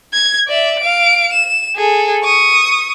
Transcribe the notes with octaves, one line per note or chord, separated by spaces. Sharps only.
G#6
D5 E5
F5 D7
E7
G#4 A4
C#6 D#6